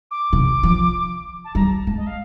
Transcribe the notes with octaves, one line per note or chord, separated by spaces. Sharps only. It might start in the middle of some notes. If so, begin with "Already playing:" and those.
D6
C3
F3
A5
G3 A#5
A5
G#3
D#5
F5